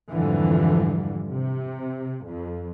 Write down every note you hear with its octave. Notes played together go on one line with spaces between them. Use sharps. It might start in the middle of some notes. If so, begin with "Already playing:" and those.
F2 G#2 D3 E3 F3 G3
C3
F2